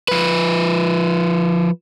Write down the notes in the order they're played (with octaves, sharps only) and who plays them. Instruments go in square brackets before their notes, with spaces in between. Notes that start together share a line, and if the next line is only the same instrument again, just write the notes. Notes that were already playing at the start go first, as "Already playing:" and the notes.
[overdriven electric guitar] F3 B4